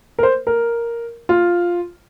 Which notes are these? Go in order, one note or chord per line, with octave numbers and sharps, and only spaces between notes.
A#4
C5
A#4
F4